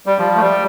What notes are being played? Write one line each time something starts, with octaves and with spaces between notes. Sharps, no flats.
G3
F3
A3
G3